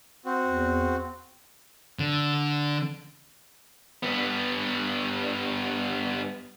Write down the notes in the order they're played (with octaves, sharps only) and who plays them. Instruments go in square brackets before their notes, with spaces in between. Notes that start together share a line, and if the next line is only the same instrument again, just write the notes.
[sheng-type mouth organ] C4 F#4
[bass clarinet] E2
[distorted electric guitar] D3
[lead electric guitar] G2 B3